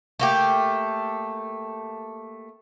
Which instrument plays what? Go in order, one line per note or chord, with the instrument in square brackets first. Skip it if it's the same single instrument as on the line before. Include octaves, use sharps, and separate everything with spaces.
[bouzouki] A3 A#3 G4